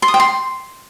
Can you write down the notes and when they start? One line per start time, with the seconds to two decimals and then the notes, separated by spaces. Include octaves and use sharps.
0.02 C6
0.08 D#6
0.14 G5
0.20 C6